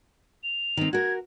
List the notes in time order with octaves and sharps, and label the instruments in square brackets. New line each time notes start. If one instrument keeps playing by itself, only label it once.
[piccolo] F7
[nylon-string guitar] D#3 C4
[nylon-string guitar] F#4 A#4 [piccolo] G#6